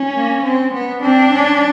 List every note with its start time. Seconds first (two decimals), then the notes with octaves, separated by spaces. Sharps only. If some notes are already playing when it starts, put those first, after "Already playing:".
Already playing: C#4
0.14 A#3
0.44 C4
0.74 B3
1.03 C4 D4
1.33 C#4